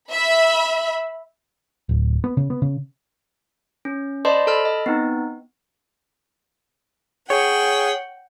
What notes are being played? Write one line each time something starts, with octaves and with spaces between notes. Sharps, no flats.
E5 B5
D1
B3
C#3
B3
C#3
C#4
C5 D5 D#5 A5 B5 C6
A4 A5 B5 F6
D#5
B3 C4 D#4
G#4 C#5 F#5 G5